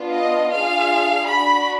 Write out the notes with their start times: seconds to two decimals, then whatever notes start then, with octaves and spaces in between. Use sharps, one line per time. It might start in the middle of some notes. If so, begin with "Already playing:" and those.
Already playing: B3 D4 F4
0.13 D#5
0.51 D4 F4 G#4 F5
1.27 D4 B5
1.32 F#4